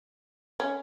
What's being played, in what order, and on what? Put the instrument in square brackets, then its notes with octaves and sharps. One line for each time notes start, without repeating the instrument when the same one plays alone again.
[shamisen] C#4